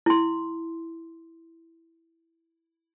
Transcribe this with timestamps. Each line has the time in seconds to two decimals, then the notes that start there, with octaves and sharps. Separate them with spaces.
0.06 E4 C6